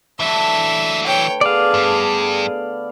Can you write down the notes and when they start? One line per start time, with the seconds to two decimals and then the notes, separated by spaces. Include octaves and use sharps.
0.20 D3 E3 F#3 A3 E5
1.06 B4 C#5 G5
1.41 D3 B3 G#4 A4 D5 F5
1.74 G2